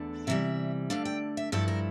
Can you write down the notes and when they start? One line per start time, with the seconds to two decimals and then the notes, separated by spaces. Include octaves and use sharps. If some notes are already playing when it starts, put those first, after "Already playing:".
Already playing: E2 D3 A3 D4
0.27 C3 E3 G3 E5
0.90 D3 A3 D4 F5
1.05 G5
1.37 E5
1.52 G2 F3 A3 E4 A4
1.68 A#4